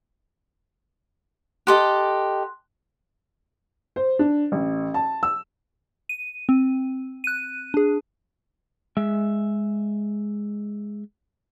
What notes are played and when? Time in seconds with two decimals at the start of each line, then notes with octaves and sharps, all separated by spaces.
1.67 G4 A4 D#5 C6 F#6
3.96 C5
4.19 D4
4.52 A1
4.94 A5
5.23 E6
6.09 D#7
6.49 C4
7.24 F#6 D#7
7.74 D4 G#4
8.97 G#3 E5